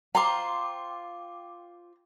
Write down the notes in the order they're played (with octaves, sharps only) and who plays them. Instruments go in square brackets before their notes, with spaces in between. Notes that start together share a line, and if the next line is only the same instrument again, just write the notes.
[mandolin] F4 C5 C6 [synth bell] G5 D6 [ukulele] A#5